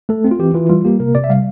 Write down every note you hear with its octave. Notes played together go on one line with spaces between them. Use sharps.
A3 A4
C4
F4
E3 G4
E3 F4
G3 F4
A#3 G4
C3 A#4
C3 D5
E5
G3 F5